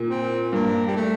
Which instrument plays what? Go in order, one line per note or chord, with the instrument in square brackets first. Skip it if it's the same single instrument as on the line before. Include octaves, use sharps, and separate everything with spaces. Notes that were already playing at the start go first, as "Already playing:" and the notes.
Already playing: [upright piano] A#2
[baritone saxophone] C4
[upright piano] G2 [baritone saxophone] A#3
[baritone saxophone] G3
A3